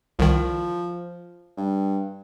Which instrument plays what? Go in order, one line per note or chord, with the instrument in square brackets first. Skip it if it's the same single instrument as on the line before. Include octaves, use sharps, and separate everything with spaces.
[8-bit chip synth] C2 D#3 [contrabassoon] F3
[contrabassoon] G2